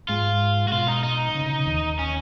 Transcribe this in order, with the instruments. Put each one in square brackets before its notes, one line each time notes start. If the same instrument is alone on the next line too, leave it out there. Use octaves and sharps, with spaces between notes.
[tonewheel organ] G#2 G#3 [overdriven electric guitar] F4
[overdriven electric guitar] F#4
[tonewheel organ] B2 [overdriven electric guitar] F4
[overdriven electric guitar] D#4
D#4
[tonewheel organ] C#3
C#3
C#3
D#2 D#3
[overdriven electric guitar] C#4